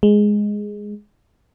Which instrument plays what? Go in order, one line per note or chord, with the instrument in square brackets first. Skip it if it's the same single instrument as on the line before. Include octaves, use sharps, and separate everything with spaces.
[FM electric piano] G#3